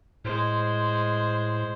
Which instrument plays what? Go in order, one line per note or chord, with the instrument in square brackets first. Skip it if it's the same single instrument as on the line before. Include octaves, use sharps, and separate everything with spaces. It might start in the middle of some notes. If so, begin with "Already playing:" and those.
[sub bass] A2 [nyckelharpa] G#3 C5